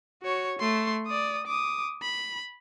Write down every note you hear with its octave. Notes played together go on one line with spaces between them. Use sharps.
F#4 C#5
A3 C6
D5 D#6
D6 D#6
B5